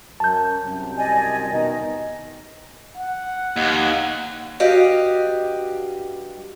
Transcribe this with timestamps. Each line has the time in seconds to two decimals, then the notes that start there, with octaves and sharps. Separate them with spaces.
0.20 F#2 A5 G6
0.63 C2 F#2 C3
0.97 D5 D#5 G#5
1.52 B2 D#3 D#5
2.97 F#5
3.56 D#2
4.60 G2 G3 F#4 G4 D#5 F5